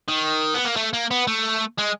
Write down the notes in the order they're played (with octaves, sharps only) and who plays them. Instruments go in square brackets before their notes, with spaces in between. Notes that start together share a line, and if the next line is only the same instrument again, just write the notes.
[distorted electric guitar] D#3
B3
A#3
A3
A#3
B3
A3
G#3